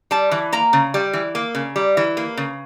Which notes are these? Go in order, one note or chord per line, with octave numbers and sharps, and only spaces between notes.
G3 A5
E3
A#3 A#5
C#3
G3
E3
A#3
C#3
G3
E3
A#3
C#3